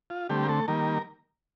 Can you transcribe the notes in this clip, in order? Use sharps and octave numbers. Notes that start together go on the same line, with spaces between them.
F4
D3 G3 A3 C4 G4
A#4
A3 A4
D#3 G3 A#3 A#4